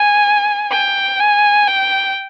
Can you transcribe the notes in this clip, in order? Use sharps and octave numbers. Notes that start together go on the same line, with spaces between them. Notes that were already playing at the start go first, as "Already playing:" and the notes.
Already playing: G#5
G5
G#5
G5